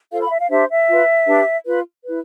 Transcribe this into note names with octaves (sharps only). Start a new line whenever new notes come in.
F4 A4 C5 F5
B5
F5
E5
F5
D4 G4 C5 E5
E5
F4 B4
D4 G4 B4
F4 B4
E4 B4